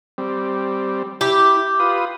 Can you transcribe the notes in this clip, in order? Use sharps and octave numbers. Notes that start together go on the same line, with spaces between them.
G3 C4
E4 G4
F4 B4 D#6